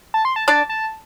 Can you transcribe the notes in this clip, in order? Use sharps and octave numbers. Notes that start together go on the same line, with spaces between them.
A5
C6
A5
D4 D5 A5
A5